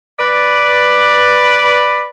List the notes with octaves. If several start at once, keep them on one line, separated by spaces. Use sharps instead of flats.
B4 D5